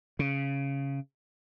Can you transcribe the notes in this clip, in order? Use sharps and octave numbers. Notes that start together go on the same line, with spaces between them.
C#3